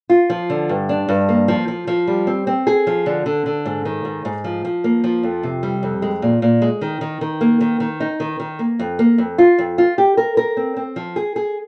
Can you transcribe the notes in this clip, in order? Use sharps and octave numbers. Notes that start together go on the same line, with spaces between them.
F4
F3
D3
G2
D4
G2
A#3
F3
F3
F3
G3
C4
C4
G#4
F3
D3
D3
D3
G#2
D#3
G#2
G#2
F3
F3
A#3
F3
F2
C3
G3
F2
G#3
A#2
A#2
G#3
D#3
D#3
D#3
A#3
D#3
D#3
D#4
D#3
D#3
A#3
F2
A#3
F2
F4
F2
F4
G4
A#4
A#4
C4
C4
F3
G#4
G#4